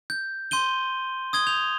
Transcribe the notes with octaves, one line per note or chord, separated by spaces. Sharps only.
G6
C6 G6 D#7 G7
D#6 G#6 G7
G6 F7